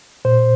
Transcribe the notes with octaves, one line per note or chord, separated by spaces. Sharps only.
A#2 C5